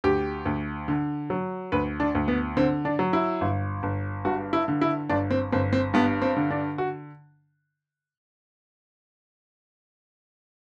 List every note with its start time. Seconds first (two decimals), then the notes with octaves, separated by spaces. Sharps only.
0.04 D2 G4
0.45 D2
0.88 D3
1.30 F#3
1.72 D2 B4
2.00 D4
2.15 D2
2.28 B3
2.57 D3 C4
2.85 D4
2.99 F#3
3.13 E4
3.41 G1
3.83 G1
4.25 G2 F#4
4.53 E4
4.68 D3
4.81 E4
5.09 G1 D4
5.31 C4
5.52 G1 C4
5.73 C4
5.94 G2 B3
6.22 C4
6.37 D3
6.51 D4
6.78 F#4